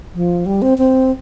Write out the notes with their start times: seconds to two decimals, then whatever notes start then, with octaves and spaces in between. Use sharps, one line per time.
0.14 F3
0.46 G3
0.62 C4
0.78 C4